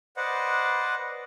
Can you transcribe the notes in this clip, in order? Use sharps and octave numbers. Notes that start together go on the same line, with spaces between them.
B4 C5 D5 D#5 F#5